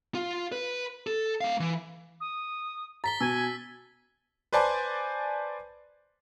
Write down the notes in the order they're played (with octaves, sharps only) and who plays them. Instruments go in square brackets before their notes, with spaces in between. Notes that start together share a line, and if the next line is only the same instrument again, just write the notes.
[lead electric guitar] F4
B4
A4
A3 F5
E3
[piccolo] D#6
[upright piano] A#5 [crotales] A6 B6 G7
[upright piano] B2 [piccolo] G#5 [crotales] E6
[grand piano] B4 C5 D5 G#5 A5 C6